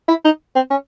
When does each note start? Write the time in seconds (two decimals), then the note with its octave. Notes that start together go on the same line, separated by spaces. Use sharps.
0.09 E4
0.25 D#4
0.56 C4
0.70 C#4